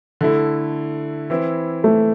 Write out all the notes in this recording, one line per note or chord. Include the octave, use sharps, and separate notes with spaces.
D3 A3 E4
E3 C4 E4
A3